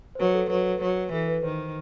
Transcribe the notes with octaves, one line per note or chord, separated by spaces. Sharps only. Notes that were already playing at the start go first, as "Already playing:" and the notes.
C5
F#3 B4
A4
F#3 B4
F#3
E3 A4
B4
D#3 C5